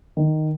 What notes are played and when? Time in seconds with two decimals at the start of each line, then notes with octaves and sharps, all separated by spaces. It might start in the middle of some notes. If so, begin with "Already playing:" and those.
0.17 D#3